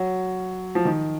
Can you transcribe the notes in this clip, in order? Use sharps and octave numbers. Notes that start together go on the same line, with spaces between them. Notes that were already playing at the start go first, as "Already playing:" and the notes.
Already playing: F#3
F3
D#3